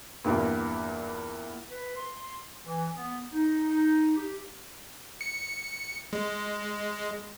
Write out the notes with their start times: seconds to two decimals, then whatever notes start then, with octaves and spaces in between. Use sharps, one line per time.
0.25 E2 G2 A#2
1.71 B4
1.96 C6
2.64 E3
2.96 B3
3.33 D#4
4.16 G4
5.21 C#7
6.13 G#3